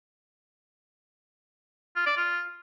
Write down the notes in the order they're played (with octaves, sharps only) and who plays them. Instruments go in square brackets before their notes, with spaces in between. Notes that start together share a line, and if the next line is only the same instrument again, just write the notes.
[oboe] F4
D5
F4